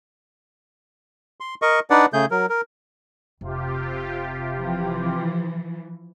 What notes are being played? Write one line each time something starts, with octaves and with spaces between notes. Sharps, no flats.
C6
A#4 D#5 C#6
D4 D#4 B4 D5 F#5
C#3 A3 G#4 G6
F#3 A#4
A#4
F1 C3 F4 G4
E3 F3